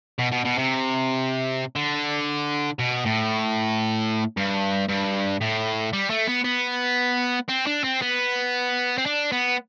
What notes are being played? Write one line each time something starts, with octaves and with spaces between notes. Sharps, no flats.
B2
B2
B2
C3
D3
B2
A2
G2
G2
A2
G3
A3
B3
B3
C4
D4
C4
B3
C4
D4
B3